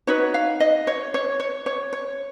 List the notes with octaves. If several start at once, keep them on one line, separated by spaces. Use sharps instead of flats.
D#4 F#4 B4 C#5
F5
D#5
C#5
C#5
C#5
C#5
C#5